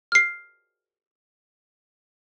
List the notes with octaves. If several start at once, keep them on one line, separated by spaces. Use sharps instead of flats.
F6 C7